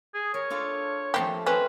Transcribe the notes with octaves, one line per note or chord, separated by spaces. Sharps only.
G#4
A#4 C#5
D4 F4 A4
F3 A3 A#3 C4 G4
C4 C#4 A#4 B4 E5